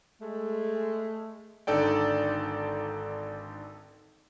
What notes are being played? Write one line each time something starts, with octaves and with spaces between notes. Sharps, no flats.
G#3 A3
G#1 D3 D#4 A4 D5 G5